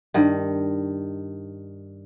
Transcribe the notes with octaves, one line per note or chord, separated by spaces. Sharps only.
G2 D#3